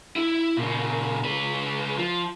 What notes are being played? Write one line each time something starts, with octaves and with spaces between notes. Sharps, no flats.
E4
A#2 C#3
C#2 B4
F3